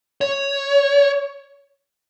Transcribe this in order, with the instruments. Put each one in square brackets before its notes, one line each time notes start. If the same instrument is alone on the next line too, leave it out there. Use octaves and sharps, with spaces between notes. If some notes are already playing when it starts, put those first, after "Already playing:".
[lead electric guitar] C#5